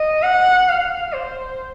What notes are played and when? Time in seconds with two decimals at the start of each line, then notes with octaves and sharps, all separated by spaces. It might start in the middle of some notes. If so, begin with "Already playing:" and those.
Already playing: D#5
0.23 F#5
0.69 F5
1.13 C5